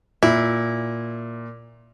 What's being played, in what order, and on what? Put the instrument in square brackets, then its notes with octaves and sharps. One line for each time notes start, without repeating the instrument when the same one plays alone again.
[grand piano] A#2 [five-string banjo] E4